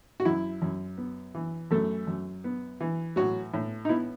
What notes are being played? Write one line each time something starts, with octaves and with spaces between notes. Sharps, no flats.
F#4
F#2 E4
F#2
B3
E3
F#2 A3 A4
F#2
B3
E3
A2 F#3 F#4
A2
D#4
B3 E4